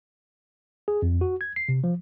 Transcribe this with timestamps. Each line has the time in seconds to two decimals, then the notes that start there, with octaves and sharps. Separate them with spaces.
0.88 G#4
1.02 F2
1.21 F#4
1.41 G#6
1.56 C7
1.69 C3
1.84 F3